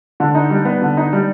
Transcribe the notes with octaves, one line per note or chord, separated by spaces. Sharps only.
D3
D#4
G3
B3
D3
D#4
G3